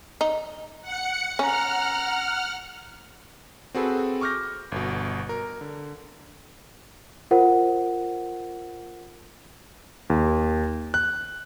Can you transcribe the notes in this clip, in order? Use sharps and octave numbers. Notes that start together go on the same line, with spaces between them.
D#4
F#5 C#7
C#4 F#5 A#5 F6
C4 F#4 G#4 A4 B4
C#6 D6 F6 G6 A#6
G1 B2
A#4
D3
F4 A#4 C5 F#5
D#2
F#6